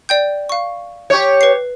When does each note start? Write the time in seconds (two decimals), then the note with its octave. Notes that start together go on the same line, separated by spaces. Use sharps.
0.09 D5 G5 G6
0.49 F5 C#6
1.10 G4 C#5
1.41 B4 C7